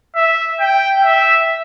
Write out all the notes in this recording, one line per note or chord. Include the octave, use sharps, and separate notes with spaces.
E5
G5
E5